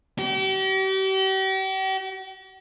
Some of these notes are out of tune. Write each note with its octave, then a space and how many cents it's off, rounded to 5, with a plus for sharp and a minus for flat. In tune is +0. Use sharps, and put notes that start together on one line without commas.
G4 -40